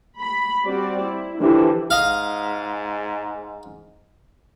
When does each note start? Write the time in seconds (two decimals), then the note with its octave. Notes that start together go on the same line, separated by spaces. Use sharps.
0.20 B5
0.65 G3 C4 F#4 D5
1.03 E4
1.41 D3 E3 F3 G3 D4 E4
1.90 G#2 D#5 F5